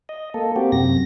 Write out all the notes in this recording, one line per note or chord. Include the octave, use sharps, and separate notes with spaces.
D#5
A#3 A4
A#3 C4 F#4 G4
F#2 C3 A#6